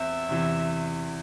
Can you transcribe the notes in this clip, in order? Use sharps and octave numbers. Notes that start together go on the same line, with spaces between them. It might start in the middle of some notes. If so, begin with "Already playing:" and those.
Already playing: E2 C4 E5
E2 C3 E3